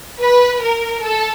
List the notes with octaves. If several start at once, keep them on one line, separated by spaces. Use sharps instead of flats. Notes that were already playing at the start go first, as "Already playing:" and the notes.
B4
A#4
A4